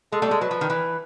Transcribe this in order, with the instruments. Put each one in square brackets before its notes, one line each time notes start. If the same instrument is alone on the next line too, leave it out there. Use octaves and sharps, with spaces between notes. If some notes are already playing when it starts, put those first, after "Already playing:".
[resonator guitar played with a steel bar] G#3 [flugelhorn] A4
[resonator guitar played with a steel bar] G3 A3
G#3
[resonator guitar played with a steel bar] F#3 [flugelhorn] B4
[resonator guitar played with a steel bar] F3
D#3
E3